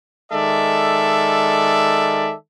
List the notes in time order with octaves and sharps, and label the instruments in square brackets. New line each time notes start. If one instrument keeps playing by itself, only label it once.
[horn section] D#3 G#3 A4 D5 E5